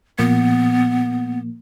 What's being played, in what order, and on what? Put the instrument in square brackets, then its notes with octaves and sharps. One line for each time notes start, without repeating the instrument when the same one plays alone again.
[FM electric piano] A#2 F3 A#3 [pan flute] B3